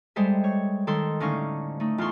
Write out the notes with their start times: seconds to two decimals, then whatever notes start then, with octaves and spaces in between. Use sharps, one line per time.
0.16 G3 G#3 A4 C5 E5
0.44 C#5
0.87 D#3 A4 C6
1.20 A2 D3 C#4 D#4 F5 C#6
1.80 A3 D#4
1.98 E2 F4 A4 C6 C#6